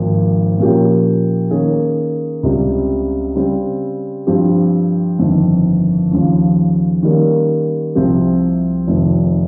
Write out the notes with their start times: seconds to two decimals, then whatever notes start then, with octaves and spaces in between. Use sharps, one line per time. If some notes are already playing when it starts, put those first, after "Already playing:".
Already playing: G#1 G#2 F3 A#3
0.59 A#2 F3 A#3 C#4 G4
1.51 D#3 A#3 C#4 G#4
2.43 C#2 C3 G3
3.35 C#3 G3 C4
4.27 G2 F3 C4 G4
5.19 G1 F2 D#3
6.11 D#2 C#3 F3
7.03 D#3 G3 A#3 C#4
7.95 C2 C3 F3 C4 G4
8.87 F1 F2 D#3